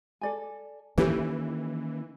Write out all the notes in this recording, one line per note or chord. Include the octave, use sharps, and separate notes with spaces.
A4 D5 G#5
D#3 E3 A#3 C#4 G4 A4 C#5